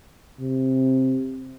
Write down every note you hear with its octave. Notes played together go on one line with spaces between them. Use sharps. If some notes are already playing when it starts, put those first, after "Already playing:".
C3